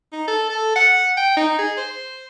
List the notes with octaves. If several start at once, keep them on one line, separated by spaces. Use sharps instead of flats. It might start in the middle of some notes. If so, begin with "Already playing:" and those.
D#4
A4
A4
F#5
G5
D#4
G#4
C5